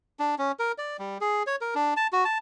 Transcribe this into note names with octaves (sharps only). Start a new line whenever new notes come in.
D4
C#4
A#4
D5
G3
G#4
C#5
A#4
D4
A5
F#4
A5